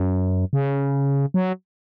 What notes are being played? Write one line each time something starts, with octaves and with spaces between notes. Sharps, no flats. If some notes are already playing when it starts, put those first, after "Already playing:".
Already playing: F#2
C#3
F#3